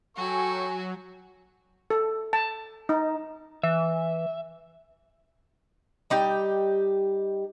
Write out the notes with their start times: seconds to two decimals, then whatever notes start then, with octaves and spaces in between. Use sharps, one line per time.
0.17 F#3 F#4 A4 G5 G#5 C#6
1.90 A4
2.33 A5
2.89 D#4
3.63 E3 E5
6.10 G3 D#4 G4 G5